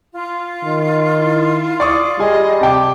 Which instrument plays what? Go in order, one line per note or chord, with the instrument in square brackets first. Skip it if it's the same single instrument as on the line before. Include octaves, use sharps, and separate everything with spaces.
[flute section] F4
[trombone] D#3
[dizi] E4
[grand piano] D5 C#6 D#6
[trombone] G3 [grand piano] G#4 G#5 [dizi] D#5
[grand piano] C3 G5 D6 [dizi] A5